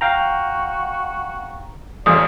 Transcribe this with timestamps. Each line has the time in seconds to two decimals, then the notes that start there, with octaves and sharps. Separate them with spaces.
0.01 F#4 F5 G5 A#5
2.06 A1 F2 D5 D#6